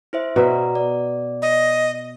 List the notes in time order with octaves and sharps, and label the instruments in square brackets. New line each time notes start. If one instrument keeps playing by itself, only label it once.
[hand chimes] E4 C5 E5
[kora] B2 E5 [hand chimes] B3 D5 A#5
[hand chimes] D5
[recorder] D#5